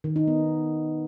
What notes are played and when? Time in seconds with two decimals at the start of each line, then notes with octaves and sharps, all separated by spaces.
0.04 D#3
0.16 D#4
0.27 B3